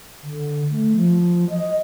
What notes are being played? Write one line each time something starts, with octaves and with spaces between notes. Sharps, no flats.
D3
A3
F3
D#5